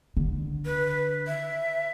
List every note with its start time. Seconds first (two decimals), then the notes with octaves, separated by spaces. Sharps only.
0.17 D3
0.66 B4
1.27 E5